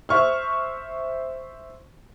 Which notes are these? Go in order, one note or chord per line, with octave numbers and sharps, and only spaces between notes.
C5 E5 C#6 F6